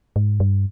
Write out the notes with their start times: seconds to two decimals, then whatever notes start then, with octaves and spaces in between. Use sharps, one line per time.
0.16 G#2
0.40 G2